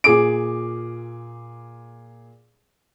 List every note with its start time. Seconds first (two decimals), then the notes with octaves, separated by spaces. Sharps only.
0.04 A#2 G#4 D6 D7